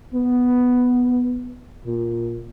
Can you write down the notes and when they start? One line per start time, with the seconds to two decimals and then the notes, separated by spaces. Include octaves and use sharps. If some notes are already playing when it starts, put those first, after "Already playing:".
0.13 B3
1.85 A#2